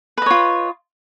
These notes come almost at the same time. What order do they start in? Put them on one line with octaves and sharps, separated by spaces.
B4 D#5 C#5 F4